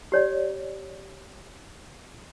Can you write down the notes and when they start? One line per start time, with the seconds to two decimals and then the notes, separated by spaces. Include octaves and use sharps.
0.12 G4 C#5 D5